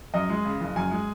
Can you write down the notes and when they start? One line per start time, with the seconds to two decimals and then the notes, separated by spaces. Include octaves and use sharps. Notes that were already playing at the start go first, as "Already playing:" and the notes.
0.14 F#2 D#5
0.30 G#3
0.45 C#3
0.60 F#1
0.76 F#2 G#5
0.91 G#3